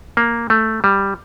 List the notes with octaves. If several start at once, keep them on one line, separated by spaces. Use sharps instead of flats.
A#3
A3
G3